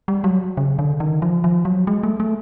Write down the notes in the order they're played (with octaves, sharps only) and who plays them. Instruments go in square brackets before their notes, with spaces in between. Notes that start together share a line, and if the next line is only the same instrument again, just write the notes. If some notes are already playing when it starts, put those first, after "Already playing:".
[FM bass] G3
F#3
C#3
D3
D#3
F3
F3
F#3
G#3
A3
A3